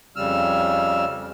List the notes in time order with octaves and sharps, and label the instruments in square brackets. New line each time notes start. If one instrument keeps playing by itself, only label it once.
[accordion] F2 C#3 G3 E6 F6